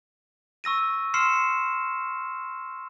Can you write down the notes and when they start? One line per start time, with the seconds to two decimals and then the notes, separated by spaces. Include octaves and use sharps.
0.64 C#6 E6 A#6 D#7
1.14 C6 E6 F6 C7 C#7 E7